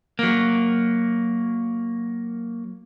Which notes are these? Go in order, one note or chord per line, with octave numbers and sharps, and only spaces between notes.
F#3 A#3